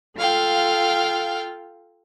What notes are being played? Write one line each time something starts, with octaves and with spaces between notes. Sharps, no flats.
F4 A4 F5 G5